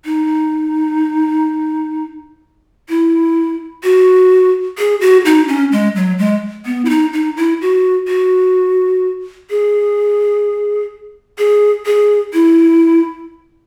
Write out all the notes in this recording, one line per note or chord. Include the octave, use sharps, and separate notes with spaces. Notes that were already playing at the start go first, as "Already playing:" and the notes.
D#4
E4
F#4
G#4
F#4
D#4
C#4
G#3
F#3
G#3
B3
E4
D#4
D#4
E4
F#4
F#4
G#4
G#4
G#4
E4